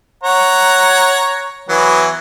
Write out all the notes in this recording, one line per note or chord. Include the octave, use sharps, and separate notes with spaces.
C#5 F#5 A#5
E3 F#3 B3